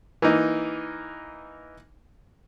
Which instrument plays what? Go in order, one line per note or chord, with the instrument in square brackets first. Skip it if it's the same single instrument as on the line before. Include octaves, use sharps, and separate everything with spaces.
[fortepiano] E3 A#3 D#4